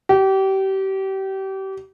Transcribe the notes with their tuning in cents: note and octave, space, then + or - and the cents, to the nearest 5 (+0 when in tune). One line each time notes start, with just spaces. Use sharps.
G4 -30